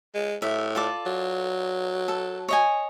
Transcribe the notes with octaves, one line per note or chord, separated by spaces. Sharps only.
G#3
A2 E5
F4 A4 D5
F#3
A4
C#5 D#5 G#5